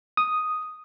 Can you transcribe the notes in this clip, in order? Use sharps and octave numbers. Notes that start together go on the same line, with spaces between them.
D#6